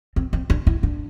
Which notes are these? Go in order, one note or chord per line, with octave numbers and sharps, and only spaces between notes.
C4
C4
D4
E4
D4